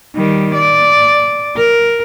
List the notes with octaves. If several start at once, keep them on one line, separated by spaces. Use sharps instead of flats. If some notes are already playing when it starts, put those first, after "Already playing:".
D#3 G3
D5
A#4